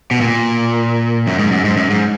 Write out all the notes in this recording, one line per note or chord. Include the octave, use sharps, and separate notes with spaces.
B2
A#2
F#2
G#2
F#2
G#2
F#2
G#2